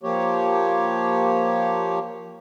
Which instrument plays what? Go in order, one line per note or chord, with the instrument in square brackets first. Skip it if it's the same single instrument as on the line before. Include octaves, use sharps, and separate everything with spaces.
[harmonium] F3 A#3 G4 C#5